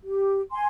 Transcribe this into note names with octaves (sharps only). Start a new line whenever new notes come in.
G4
G#5 C6